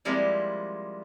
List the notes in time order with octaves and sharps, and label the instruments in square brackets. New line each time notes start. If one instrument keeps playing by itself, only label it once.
[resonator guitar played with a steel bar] F3 G3 G#3 A#3 C4 E4